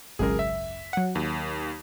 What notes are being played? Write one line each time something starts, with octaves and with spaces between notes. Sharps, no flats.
G#1 C#2 F#2 G#4 A#4
E5
F#3 F#5
D#2